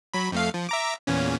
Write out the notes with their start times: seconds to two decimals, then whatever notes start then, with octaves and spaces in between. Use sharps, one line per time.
0.14 F#3 B5
0.32 F2 A3 F5
0.54 F3
0.69 E5 A#5 D6
1.07 E2 A#2 C#4